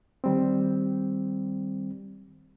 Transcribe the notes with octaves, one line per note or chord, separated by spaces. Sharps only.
D#3 G3 C4